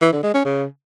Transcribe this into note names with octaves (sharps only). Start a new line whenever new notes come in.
E3
D3
G#3
C#4
C#3